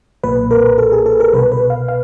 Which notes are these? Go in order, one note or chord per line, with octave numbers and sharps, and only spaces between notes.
B1 A#2 B4
A#4
A4
G#4
A4
A#4
C2 B2 B4
B4
F5
F5